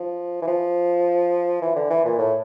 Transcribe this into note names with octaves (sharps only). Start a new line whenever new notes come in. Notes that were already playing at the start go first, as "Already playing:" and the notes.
Already playing: F3
E3
F3
E3
D3
E3
A#2
A2